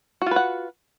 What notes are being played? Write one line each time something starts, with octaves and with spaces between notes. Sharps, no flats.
F4 F#4 B4 F#5